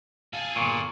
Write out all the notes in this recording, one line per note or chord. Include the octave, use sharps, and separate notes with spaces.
G#4 A4 F5
G1 A#2 C#6